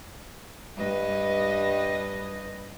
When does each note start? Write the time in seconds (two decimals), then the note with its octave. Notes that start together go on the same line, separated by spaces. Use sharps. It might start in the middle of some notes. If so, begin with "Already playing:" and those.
0.77 G2 B4 D#5